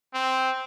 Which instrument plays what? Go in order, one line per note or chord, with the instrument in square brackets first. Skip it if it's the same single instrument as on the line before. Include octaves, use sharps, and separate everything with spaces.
[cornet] C4